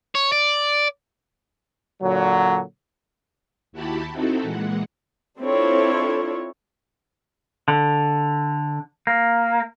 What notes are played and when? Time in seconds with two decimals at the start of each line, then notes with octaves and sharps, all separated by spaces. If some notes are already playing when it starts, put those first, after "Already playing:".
0.15 C#5
0.32 D5
2.01 A#2 D3 F#3
3.72 D#2 E4 F#4 G4 A5 B5
4.12 C4 D#4 E4 F#4 A4
4.42 A#2 E3 G#3 F#5
5.39 C4 D4 E4 F4 A4 C#5
7.68 D3
9.07 A#3